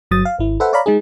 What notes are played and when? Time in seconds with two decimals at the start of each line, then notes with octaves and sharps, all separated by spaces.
0.11 G1 F#3 D#6 A6
0.25 F5
0.38 G#1 E4
0.60 A4 B4 C5 E5 F#5
0.73 C#5 D5 F5 A#5 B5
0.86 G#3 D#4 G#4